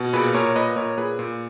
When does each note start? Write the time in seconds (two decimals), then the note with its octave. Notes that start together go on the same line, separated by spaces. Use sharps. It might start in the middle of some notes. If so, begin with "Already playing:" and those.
Already playing: B2
0.13 A#2 G#4 B4
0.34 A#2 A#4 C#5
0.56 A#2 B4 D#5
0.76 A#2 A#4 C#5
0.97 A#2 G#4 B4
1.19 A#2